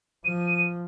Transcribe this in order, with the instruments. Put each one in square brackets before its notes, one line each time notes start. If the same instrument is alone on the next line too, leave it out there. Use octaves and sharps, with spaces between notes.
[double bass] F3 [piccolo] D#7